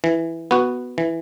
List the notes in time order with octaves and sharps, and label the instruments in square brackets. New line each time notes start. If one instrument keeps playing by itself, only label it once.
[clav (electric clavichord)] E3
B3 F#4
E3